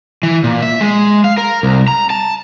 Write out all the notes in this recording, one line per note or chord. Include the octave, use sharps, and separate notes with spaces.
E3
A#2
E5
G#3
F5
A#4
C2
A#5
A5